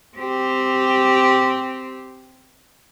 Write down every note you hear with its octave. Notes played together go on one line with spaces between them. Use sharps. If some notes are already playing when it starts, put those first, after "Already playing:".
C4 G4